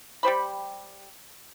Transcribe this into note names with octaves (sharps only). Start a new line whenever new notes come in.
G3 G4 C5 B5